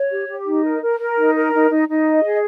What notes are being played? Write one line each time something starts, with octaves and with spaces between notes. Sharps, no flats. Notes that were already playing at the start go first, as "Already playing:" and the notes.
Already playing: C#5
G4
G4
D#4
A#4
A#4
A#4
D#4
A#4
D#4
D#4
D#4
D#5
G#4